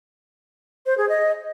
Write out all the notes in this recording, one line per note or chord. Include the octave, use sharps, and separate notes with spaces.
C5
G#4
D#5